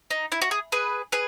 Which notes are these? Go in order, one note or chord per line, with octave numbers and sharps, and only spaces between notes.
D#4
E4
F#4
G#4
G#4 B4
G#4 B4